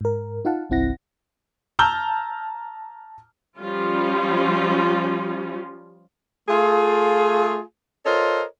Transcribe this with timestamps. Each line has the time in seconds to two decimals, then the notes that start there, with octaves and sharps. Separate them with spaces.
0.01 G#2 A#4
0.45 D#4 F4 F5 F#5 A5
0.70 G1 C2 C4 E4 F#5 A#6
1.79 A5 A#5 E6 F6 G6 G7
3.57 F3 G3 C#4 F4
6.49 A3 F4 G#4
8.06 F4 A4 A#4 C5 C#5 D#5